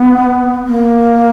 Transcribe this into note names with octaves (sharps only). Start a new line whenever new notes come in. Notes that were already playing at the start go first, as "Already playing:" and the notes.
Already playing: B3
A#3